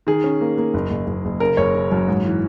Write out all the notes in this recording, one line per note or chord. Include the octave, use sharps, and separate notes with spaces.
D#3 G#4
C#4
A#3
A#3
F#1
F#1
F#1
F#1
C#3 A#4
F#1 C#5
C#3
F#2
G#2
E3